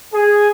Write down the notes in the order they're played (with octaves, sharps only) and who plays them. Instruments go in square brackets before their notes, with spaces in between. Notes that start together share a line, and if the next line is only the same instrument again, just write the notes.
[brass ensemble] G#4